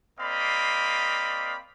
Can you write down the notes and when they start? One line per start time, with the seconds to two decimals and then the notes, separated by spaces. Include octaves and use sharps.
0.20 A#3 C4 D5 D#5 F5 B5